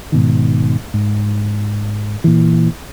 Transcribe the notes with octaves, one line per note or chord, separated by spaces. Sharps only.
G#2 B2 D#3
G#2
A#2 E3